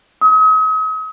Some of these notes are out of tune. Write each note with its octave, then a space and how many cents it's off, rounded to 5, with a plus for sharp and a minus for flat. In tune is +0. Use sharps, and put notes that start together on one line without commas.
D#6 +40